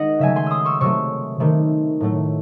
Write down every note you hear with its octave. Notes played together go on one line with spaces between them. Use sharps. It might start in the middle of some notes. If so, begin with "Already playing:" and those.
Already playing: D#3 G#3 D#5 F#5
C#3 F#3 A3 E5 G#5
G#5 C6
C6 D#6 E6
C#6 E6
C3 F#3 A3 C#6 E6
C3 D#3 A3
A2 F#3 A3